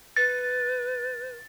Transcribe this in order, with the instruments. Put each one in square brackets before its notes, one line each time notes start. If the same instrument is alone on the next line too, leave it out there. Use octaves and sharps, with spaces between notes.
[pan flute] B4 [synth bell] A6